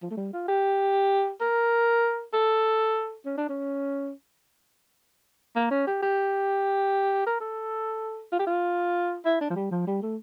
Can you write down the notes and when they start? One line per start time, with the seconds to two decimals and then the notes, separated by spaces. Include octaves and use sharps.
0.02 F3
0.10 A3
0.17 G3
0.33 F4
0.48 G4
1.41 A#4
2.33 A4
3.26 C#4
3.38 D4
3.49 C#4
5.56 A#3
5.71 C#4
5.87 G4
6.02 G4
7.26 A#4
7.40 A4
8.32 F4
8.39 G4
8.47 F4
9.25 E4
9.41 D4
9.50 F3
9.56 G3
9.71 F3
9.87 G3
10.02 A3